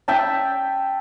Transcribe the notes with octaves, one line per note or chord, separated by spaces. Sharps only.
E5 G5 A5